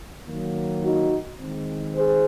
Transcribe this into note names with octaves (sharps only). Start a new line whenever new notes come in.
D#3 F#3 A#3
D#4 F#4
D#3 G#3 C4
G#4 C5